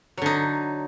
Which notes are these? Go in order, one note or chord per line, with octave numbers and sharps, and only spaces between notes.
D3 F#3 D#4